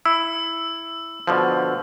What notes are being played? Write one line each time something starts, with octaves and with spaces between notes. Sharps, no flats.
E4 E6
B2 D3 F3